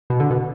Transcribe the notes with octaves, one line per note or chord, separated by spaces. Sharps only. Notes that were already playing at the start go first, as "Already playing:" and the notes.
B2
D3
B2